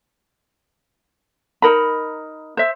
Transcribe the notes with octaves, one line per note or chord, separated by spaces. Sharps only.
D#4 A#4 B5
C5 E5